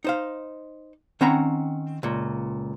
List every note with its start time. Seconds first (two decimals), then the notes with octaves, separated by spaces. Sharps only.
0.04 D#4 C5 F5
1.21 D#3 C4 C#4 F#5 A#5 B5
2.03 C#2 A#2